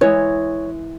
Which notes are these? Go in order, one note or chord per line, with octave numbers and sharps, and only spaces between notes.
E3 G#3 G#4 C#5